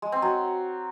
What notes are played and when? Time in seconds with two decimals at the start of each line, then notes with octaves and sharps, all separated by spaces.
0.02 G#3
0.12 C4
0.22 F#3